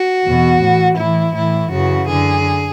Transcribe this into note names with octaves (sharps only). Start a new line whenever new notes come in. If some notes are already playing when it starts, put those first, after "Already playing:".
Already playing: F#4
E2 B2
A2 E3
A2 E3 E4
A2 E3 E4
F#2 C#3 E3 F#4
F#2 D3 G#4